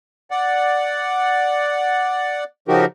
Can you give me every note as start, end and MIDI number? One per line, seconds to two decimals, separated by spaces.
0.31 2.44 74
0.31 2.44 78
2.68 2.85 49
2.68 2.85 53
2.68 2.85 63
2.68 2.85 66
2.68 2.85 67
2.68 2.85 70